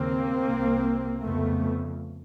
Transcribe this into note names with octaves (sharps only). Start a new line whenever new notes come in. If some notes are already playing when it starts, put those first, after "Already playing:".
Already playing: D#2 C#3 A#3 C4
C2 C3
F2 C#3 A3 B3